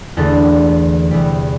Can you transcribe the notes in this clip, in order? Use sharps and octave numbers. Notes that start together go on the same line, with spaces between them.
E2 D3 A3 A4
E2 C3 G3